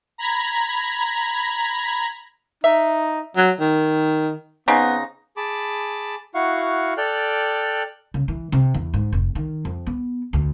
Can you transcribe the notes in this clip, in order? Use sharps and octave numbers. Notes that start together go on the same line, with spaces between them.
A#5 B5 G#6
D#4 E5
F#3
D#3
C#3 B3 C4 D#4
G#4 A5 B5 D6
E4 F#4 F5 F#5 C#6
A4 D5 G5 F6 F#6
C#3
E3
C3
E2
G#2
F1
D#3
F2
B3
D2